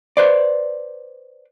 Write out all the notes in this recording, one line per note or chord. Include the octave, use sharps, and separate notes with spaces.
B4 C5 D5